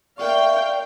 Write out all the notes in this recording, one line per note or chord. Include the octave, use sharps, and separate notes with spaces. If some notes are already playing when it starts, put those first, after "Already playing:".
A#4 D5 E5 F5 G5 C#6